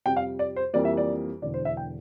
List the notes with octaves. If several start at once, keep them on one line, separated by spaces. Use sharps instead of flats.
F2 C3 G3 G5
F5
D5
C5
F2 E3 G3 A#3 D5
E5
D5
E1 E2 D3 D5
C5
E5
G5